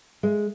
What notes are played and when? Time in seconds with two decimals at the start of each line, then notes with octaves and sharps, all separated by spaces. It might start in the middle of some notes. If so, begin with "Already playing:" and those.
0.23 G#3